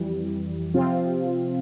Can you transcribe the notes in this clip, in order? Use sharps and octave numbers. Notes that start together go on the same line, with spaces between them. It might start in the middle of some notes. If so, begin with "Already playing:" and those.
Already playing: F2 E3 G3
C3 F3 C4 F4